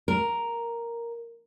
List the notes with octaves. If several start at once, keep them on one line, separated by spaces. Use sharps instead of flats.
A#4